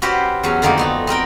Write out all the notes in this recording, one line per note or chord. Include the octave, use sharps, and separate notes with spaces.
C#4 E4 F#4 G4 B4 C5
E2 F#3 C#4 G#5
F2 D3 D#3 A#3 C4 D#4
A3 B3 C4
B3 C4 A#4 G5